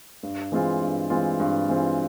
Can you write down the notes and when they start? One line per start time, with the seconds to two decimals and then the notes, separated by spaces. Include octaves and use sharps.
0.23 G2
0.52 E3 G#3 C4 F4
0.81 G2
1.10 E3 G#3 C4 F4
1.40 G2
1.69 E3 G#3 C4 F4